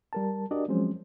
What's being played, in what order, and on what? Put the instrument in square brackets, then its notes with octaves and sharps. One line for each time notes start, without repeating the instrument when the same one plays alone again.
[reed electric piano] G3 A#4 A5
D4 F#4 G4 A#4 D5 D#5
F3 F#3 G#3 C4 C#4 C5